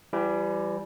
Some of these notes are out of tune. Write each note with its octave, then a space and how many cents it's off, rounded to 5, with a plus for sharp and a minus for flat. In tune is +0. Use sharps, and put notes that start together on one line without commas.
E3 +35 G3 +0